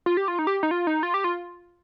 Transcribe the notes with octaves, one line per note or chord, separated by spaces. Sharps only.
F4
G4
F4
D#4
G4
D#4
F4
D#4
F4
G4
F4